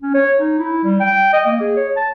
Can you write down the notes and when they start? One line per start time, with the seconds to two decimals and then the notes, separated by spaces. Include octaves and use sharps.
0.02 C#4
0.14 C#5
0.39 D#4
0.59 E4
0.84 G3
1.00 G5
1.33 D#5
1.46 A#3
1.60 G#4
1.76 C#5
1.96 A5